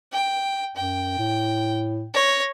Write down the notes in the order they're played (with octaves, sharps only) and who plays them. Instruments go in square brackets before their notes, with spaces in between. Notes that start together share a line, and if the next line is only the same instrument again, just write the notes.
[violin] G5
[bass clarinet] F#2 [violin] G5
[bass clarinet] A2
[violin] C#5 A#6